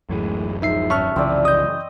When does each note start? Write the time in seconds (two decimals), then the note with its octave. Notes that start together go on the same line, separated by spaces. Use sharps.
0.09 D1 F#2 A2 E3 G#3
0.62 F3 G#3 D#4 E5 C7
0.90 G#1 C#4 E5 A5 C#6 F6 F#6
1.16 C2 F#2 C#3 E3 F3 C4 D5
1.45 D#5 D#6 G6